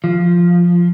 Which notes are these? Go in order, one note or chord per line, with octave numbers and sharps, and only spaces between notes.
F3